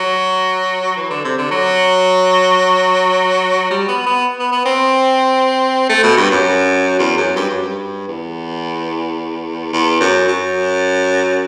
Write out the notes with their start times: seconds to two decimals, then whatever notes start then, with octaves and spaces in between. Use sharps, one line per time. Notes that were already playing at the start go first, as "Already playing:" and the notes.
Already playing: F#3
0.96 E3
1.10 D3
1.24 C3
1.38 D3
1.51 F#3
3.71 G3
3.88 B3
4.06 B3
4.39 B3
4.52 B3
4.65 C4
5.89 A3
6.03 B2
6.17 G2
6.31 F#2
6.99 E2
7.17 F#2
7.36 G2
7.49 F#2
7.62 G2
8.08 E2
9.73 E2
10.00 F#2
10.28 F#2